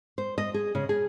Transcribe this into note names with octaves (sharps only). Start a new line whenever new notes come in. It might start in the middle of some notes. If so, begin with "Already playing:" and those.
C5
D#5
G#4
C#3
G#4